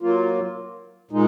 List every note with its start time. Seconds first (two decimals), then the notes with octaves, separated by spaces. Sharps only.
0.01 F#3 A#3 F4
1.11 A#2 G#3 D#4